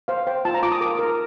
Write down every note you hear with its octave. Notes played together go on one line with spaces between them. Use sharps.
C5 F5
C5 G5
F4 A5
A#5
F4 D6
D#6
A#4 D6
A#4